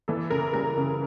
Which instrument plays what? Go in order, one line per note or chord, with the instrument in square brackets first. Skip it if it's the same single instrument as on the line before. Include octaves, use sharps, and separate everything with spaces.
[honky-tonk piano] E3 A4
C#3 A#4
G3 A#4
C#3